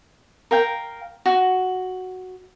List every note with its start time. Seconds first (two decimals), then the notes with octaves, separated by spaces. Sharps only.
0.51 A#4 F5 G5
1.26 F#4